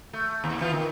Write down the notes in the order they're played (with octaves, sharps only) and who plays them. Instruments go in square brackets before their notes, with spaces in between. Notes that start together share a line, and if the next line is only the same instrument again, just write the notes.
[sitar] A3
D#2
E3 B3 F4
D#3